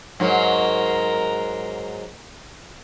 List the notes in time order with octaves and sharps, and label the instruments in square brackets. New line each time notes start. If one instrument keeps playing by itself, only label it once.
[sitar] G#2 F#3 [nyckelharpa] A#4 A#5